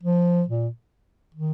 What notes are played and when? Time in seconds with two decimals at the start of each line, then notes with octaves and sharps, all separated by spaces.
0.03 F3
0.48 A#2
1.35 D#3